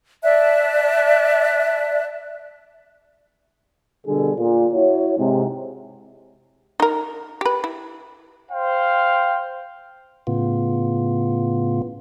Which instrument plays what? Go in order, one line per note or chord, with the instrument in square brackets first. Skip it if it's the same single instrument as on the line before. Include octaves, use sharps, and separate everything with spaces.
[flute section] D5 E5 A5 F#6
[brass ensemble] B2 D3 G3 G#4 A4
A#2
E4 F#4 C#5
G#2 C3
[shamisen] D#4 A#4
G4 B4
E4
[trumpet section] C5 F5 G5
[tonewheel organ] A2 C#3 B3 F4